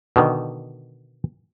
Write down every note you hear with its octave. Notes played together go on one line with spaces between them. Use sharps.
B2 D3 D#3